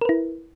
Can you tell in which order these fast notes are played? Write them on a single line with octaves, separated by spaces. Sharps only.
A#4 B4 E4